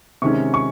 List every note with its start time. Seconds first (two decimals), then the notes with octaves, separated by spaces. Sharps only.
0.22 C3 D#3 G#3 C#4 C#6
0.54 C#6